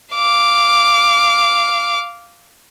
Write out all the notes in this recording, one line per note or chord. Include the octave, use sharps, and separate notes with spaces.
F5 D6